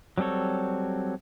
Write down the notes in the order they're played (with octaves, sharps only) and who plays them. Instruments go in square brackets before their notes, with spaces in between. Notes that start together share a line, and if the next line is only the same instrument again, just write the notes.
[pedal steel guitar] F#3 G3 C4 A4 C#5